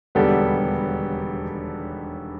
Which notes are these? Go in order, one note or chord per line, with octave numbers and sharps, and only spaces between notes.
E1 D#2 D3 G3 B3 G4 A4